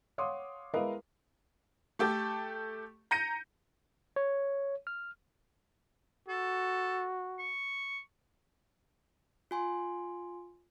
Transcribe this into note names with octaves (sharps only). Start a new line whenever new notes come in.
C#5 F5 F#5 C6 D6 D#6
G#3 E4 A#4 B4 D#5 F5
A3 G4 A4
A#5 G6 A#6 C#7 D#7
C#5
F6
F#4 A4
C#6
F4 G#5 C6